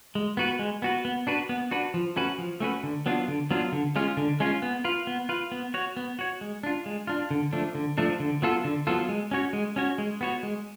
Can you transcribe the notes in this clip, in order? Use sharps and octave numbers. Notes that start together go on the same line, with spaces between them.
G#3
B3 F#4 B4
G#3
B3 F#4 B4
B3
D4 F#4 B4
B3
D4 F#4 B4
F3
A3 C#4 F#4 B4
F3
A3 C#4 F#4 B4
D3
F#3 B3 D4 F4
D3
F#3 B3 D4 F4
D3
G#3 C#4 F4
D3
G#3 C#4 F4
B3
F4 B4
B3
F4 B4
B3
F#4 C#5
B3
F#4 C#5
G#3
D4 F4
G#3
D4 F4
D3
F3 A3 D4
D3
F3 A3 D4
D3
F#3 B3 F4 A4
D3
F#3 B3 F4 A4
G#3
C#4 F#4 C#5
G#3
C#4 F#4 C#5
G#3
B3 F#4 C#5
G#3